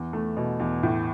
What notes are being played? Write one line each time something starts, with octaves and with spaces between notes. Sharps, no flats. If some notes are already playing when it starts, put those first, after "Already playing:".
Already playing: E2
A3
B2
E2
A2